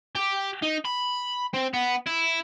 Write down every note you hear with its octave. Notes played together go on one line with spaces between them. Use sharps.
G4
D#4
B5
C4
B3
E4